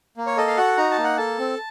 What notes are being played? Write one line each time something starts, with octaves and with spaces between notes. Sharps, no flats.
A#3
C#5
A4 D#5
F5
F#4 F#5
D#4 A#5
A5
A#3
F#5
A4 A5
C4